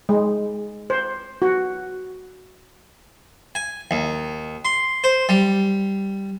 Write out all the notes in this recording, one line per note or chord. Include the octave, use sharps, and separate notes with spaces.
G#3
C5
F#4
G#5
D#2
C6
C5
G3